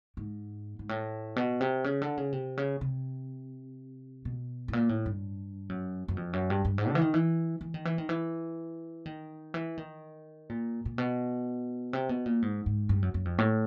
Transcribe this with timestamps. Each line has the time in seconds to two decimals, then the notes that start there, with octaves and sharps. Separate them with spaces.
0.17 G#2
0.79 G#2
0.89 A2
1.36 B2
1.61 C3
1.84 C#3
2.02 D3
2.17 C#3
2.32 C3
2.57 C#3
2.81 C3
4.25 B2
4.68 A2
4.73 A#2
4.89 A2
5.06 G2
5.69 F#2
6.08 F#2
6.17 F2
6.33 F#2
6.50 G2
6.65 G2
6.78 G#2
6.89 D3
6.95 E3
7.01 D#3
7.14 E3
7.61 E3
7.74 D#3
7.85 E3
7.98 D#3
8.09 E3
9.06 D#3
9.54 E3
9.78 D#3
10.49 A#2
10.85 A#2
10.98 B2
11.93 C3
12.09 B2
12.26 A#2
12.42 G#2
12.66 G#2
12.89 G2
13.02 F#2
13.14 F#2
13.25 F2
13.38 A2